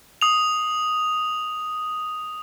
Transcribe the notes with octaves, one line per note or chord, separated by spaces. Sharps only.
D#6 F7